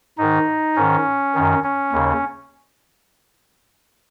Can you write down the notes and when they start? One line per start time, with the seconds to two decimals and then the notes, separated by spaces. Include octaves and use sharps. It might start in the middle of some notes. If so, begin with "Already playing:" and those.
0.18 G#2 D#3 D#4
0.76 G#2 D#3 C#4
1.35 F#2 D#3
1.64 C#4
1.92 D#2 C#3